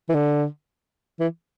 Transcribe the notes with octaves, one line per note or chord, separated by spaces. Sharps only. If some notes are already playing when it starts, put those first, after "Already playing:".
E3
D3
E3